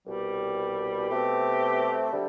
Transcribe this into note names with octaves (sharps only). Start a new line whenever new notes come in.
C2 B2 G3
B2 A3 C4 G4
D3 G3